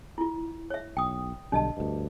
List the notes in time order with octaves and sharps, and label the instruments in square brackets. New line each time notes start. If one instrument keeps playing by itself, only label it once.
[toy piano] E4 F4
C#5 E5
[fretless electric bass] B1 [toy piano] G5 D#6
[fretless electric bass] B1 D3 G3 [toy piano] D4 D#5 A5
[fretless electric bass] D2 G2